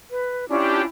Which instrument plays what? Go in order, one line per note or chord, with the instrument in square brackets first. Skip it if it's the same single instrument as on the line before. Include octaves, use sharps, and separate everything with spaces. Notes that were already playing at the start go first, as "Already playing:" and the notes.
[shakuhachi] B4
[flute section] C#4 D4 F4 [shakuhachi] E4 [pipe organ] G4